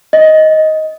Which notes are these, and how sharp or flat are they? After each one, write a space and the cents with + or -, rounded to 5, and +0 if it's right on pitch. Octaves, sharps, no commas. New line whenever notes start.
D#5 +10